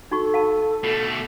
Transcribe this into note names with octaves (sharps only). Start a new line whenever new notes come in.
D#4 F#4 A4 C#6
F5 A5 B5
B2 A3